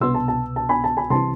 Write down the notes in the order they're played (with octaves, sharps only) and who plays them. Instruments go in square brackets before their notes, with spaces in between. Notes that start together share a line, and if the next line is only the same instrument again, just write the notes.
[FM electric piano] C2 B2 B3 [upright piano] C6 E6
[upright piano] A5
A5
A5
G#5 B5
A5
G#5 B5
[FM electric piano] C2 C3 E3 [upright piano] A5 C6